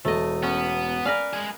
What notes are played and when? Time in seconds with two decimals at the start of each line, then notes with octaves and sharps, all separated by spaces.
0.05 E1 A3 A4 D#5
0.43 B3 C#4
1.05 A#4 B4 D5 F5 G#5
1.33 G#3 G#4